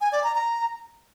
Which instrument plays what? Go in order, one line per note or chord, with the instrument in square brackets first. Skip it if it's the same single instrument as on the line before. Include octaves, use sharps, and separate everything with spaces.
[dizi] G#5
D5
A#5
A#5